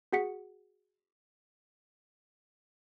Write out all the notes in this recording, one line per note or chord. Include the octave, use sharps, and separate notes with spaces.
F#4 G#4 F#5 B6 C#7